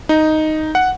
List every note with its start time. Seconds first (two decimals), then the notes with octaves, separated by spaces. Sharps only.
0.09 D#4
0.75 F#5